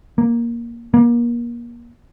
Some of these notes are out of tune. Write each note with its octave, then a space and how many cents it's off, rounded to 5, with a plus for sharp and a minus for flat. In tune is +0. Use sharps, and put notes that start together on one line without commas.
A#3 +10
A#3 +30